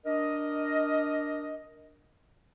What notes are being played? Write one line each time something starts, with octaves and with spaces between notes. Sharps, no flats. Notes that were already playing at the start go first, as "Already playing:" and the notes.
D4 A#4 D#5